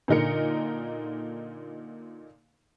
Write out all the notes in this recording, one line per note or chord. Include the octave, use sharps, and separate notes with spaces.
A#2 D3 D#4 A#4 C#7